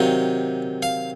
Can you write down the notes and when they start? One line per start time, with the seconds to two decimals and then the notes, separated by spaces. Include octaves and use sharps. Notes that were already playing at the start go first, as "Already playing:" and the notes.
Already playing: C3 D#3 F#3 F5
0.83 F5